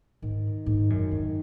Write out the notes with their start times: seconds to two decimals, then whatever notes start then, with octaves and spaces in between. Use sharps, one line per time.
0.22 G#2 D#3
0.66 G#2
0.90 F#2
1.12 G#3